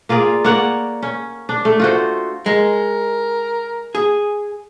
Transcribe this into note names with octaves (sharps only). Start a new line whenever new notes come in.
A#3 F4 G#4 D5
A#3 C#5 D5 F#5
C#4
D4
A3
F4 F#4 C5
G#3 A#4
G#4